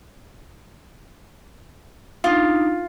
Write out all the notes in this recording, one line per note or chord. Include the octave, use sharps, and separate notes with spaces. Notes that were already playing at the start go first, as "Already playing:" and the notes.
D4 D#4 F4